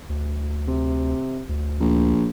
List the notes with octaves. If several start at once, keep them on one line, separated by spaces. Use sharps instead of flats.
D2
C3
D2
A#1